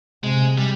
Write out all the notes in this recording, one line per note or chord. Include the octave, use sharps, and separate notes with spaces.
C3 G#3
G3